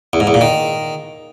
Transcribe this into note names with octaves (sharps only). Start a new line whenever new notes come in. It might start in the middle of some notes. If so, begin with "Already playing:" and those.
E2
G#2
E2
A#2
D#3